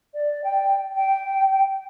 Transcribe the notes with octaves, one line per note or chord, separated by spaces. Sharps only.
D5
G5
G5